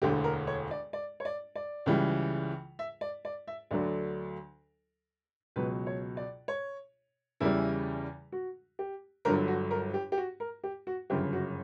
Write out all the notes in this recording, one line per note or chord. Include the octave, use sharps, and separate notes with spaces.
E1 D2 D3 G4
A#4
C#5
D5
D5
C#5
D5
D5
C#2 C#3 E3 G3
E5
D5
D5
E5
D2 D3 F#3 D5
C#2 B2 F#3 B4
C#5
D5
C#5
E2 C#3 E3 G3 E4
F#4
G4
G1 G2 D3 F#3 A#4
F#4
A#4
G4
G4
F#4
A#4
G4
F#4
G1 F#2 C#3 G4
F#4